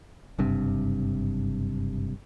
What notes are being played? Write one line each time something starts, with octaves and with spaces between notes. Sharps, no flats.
F#1 G2 C3